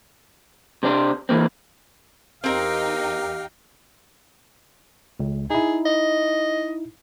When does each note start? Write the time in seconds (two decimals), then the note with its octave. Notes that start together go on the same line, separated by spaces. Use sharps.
0.83 C3 C4 D4 C5
1.29 E3 F3 A#3 C4
2.44 E2 C4 D#4 G4 A#4 F5 G5
5.20 C#2
5.50 D#4 E4 G#4
5.86 D#5